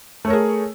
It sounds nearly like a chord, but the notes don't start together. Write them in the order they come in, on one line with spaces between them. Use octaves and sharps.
A3 C#5 A#4 G#4